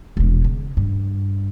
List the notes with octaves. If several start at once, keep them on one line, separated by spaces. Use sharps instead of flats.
E1 G#3
C#3
G2